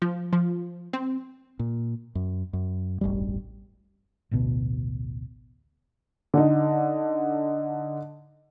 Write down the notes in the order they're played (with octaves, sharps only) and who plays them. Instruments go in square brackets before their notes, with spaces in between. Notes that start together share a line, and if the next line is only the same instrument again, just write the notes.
[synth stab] F3
F3
C4
[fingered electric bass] A#2
F#2
F#2
E1 A1 G2 G3
A1 D2 B2
[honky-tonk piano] D3 D#4